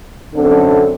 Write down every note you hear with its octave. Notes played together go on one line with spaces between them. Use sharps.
F#2 D3 C4 D4 A4